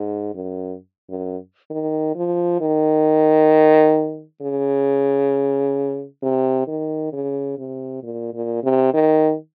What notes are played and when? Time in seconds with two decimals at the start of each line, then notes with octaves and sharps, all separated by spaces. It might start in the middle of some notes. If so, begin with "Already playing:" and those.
Already playing: G#2
0.34 F#2
1.10 F#2
1.70 D#3
2.16 F3
2.61 D#3
4.42 C#3
6.23 C3
6.67 D#3
7.13 C#3
7.58 C3
8.03 A#2
8.34 A#2
8.64 C3
8.94 D#3